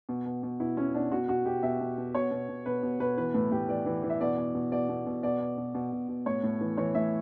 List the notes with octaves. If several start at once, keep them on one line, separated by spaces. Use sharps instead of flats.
B2
B2
B2
B2 E4
B2 C#4
B2 D4
B2 F#4
B2 F#4
B2 G4
B2 E5
B2
B2
B2 C#5
B2
B2
B2 B4
B2
B2 B4
E3 B4
A2 B4
A2 G4
E3 D5
E3
E3
E5
B2 D5
B2
B2
B2 D5
B2
B2
B2 D5
B2
B2
B2
B2
B2
A2 C#5
A2
E3
E3 C#5
A2 E5